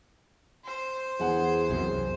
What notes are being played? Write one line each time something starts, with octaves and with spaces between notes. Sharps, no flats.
C5
E2 E3 G#4 F#5
C2 F#2 C3